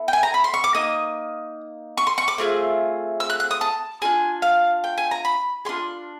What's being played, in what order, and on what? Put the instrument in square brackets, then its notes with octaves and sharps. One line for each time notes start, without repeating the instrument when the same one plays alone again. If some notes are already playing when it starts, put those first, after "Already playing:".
Already playing: [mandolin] B3 E4 A4
G5
G#5
A#5
B5
C6
C#6
D6
A#3 D#4 D#6
C#6
C6
C#6
D6
A3 C4 F4 G#4
E6
F#6
F#6
D#6
A5
D4 F4 G#4 G#5
F5
G5
G#5
A#5
B5
D4 F4 G#4 C6